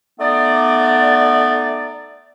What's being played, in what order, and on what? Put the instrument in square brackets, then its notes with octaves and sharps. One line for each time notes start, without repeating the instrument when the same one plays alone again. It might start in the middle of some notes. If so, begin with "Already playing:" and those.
[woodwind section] A3 B3 D#4 D5